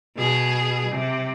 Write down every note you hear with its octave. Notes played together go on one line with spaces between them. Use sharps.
B2 G#4
C3